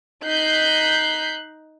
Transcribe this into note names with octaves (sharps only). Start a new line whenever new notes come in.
D#4 F#6 G6 B6 C7